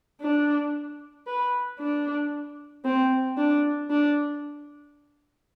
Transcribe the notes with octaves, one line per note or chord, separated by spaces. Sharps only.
D4
B4
D4
C4
D4
D4